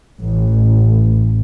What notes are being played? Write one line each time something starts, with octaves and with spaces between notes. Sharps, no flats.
A1